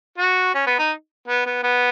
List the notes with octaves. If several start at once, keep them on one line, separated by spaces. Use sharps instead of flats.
F#4
C#4
B3
D#4
B3
B3
B3